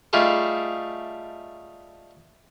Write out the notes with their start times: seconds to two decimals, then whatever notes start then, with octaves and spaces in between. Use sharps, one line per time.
0.13 G3 A3 D#4 F4 G#4 A4